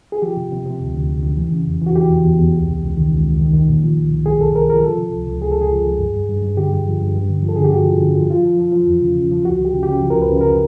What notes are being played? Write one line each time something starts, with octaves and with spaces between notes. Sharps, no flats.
G#4
F3 G4
C3
C3
C3
D2
D2
D2
D2
E3
C#3
E2
E3 F#4
E3 G4
E2
E2
E2
C#2
C3
C#2
D#3
C#2
C#2
D#3
D#3
A#2
F3
C2
C2
C2 G#4
C2 A4
C2 A#4
F3 A#4
F3 A4
C3
C#2
C#2
C#2 G#4
C#2 A4
G#4
F3
C#2
G2
G2
G2
G2
D3 G4
G2
F3
G2
G2
D3
F3
A4
D3 G#4
G4
G2 F#4
F3
D3
F3
F3 F4
F3
F3
F3
E2
C#3
C#3
F3
C#2 F#4
F3 G4
C#3
G4
C#3
F3
A#4
C#2
B4
C#3
A#4